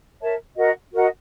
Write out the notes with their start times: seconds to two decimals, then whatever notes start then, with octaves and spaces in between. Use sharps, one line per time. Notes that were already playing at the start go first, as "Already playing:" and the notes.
0.21 A#4 C#5 E5 A5
0.57 F#4 A#4 D#5 F#5
0.94 F#4 A#4 D#5 F#5